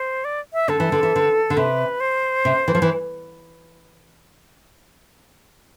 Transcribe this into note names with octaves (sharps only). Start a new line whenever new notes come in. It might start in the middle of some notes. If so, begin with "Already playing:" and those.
Already playing: C5
D5
E5
D3 A4
E3
D3
E3
D3
D3
C3 B4
C5
C3
E3
F3
E3